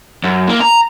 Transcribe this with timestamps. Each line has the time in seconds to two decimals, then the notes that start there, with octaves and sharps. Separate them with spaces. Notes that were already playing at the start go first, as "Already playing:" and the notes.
0.23 F#2
0.48 A#3
0.60 A#5